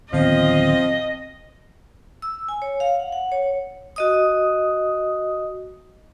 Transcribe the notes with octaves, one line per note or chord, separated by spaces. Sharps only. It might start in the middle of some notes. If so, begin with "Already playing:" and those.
D1 D#3 F3 B3 C4 D#5 F5
E6
G#5
C#5
F5
F#5
F#5
C#5
F#4 D#5 D#6